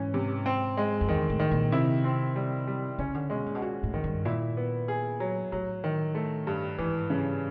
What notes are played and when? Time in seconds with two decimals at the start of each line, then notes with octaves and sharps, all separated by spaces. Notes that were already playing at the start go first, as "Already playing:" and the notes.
Already playing: G#2 E3 C#4
0.14 C3
0.46 C4
0.77 G#3
1.01 F2
1.08 E2 D#3
1.29 A2
1.40 D#3
1.51 A#2
1.72 C3 E4
2.04 C4
2.36 G3
2.67 G3
2.98 C#3 C#4
3.14 D3
3.30 B2 G#3
3.46 A#2
3.55 B2
3.62 A#2 F#4
3.83 A2
3.94 D#3
4.04 G2
4.25 A#2 E4
4.57 B3
4.88 G#4
5.20 F#3
5.52 A2 F#3
5.84 D#3
6.15 A3
6.47 G2
6.78 G#2 E3
7.10 C#3